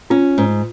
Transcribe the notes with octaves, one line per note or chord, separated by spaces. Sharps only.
C#4 F4
G#2